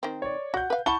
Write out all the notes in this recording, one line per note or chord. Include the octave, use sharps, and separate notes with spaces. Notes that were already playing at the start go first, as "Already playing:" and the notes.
D#3 C4
C#5 D5
F#4 F#5 G6
B4 F5
E4 F#5 A5 B5 C#6 G7